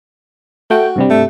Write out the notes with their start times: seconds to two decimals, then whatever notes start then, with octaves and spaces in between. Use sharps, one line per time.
0.70 A3 F#4 G5
0.96 G2 C3 G3
1.10 A3